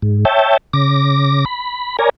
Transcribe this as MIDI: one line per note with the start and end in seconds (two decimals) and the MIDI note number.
0.02 0.25 44
0.25 0.57 73
0.25 0.57 76
0.25 0.57 79
0.25 0.57 81
0.73 1.45 49
0.73 1.45 86
0.73 1.45 94
1.45 1.97 83
1.99 2.10 70
1.99 2.10 73
1.99 2.10 74
1.99 2.10 80
1.99 2.10 82